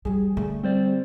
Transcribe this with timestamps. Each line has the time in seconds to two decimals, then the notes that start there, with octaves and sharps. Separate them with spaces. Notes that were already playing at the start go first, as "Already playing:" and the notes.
0.05 F3 G3 G#4
0.37 D3 A3
0.63 G3 C4 C5 D5